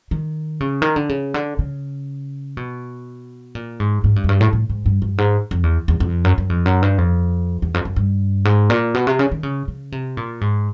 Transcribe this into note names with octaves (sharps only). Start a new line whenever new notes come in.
D#3
C#3
D#3
D3
C#3
D3
C#3
B2
A#2
G#2
G#2
G2
F#2
G2
A2
A2
G#2
G2
G2
G#2
F2
E2
E2
F2
F#2
F#2
F2
F#2
G2
F2
E2
F2
F#2
G2
G#2
A#2
B2
C3
C#3
D#3
C#3
C#3
C3
A#2
G#2